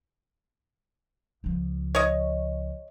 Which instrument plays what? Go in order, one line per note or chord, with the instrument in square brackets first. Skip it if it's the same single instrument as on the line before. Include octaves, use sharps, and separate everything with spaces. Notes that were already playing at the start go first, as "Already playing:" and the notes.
[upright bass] C#2 F3
[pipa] C#5 D#5